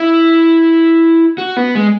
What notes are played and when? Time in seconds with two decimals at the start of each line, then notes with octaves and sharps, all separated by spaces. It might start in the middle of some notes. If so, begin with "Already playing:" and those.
Already playing: E4
1.38 F#4
1.57 B3
1.75 G#3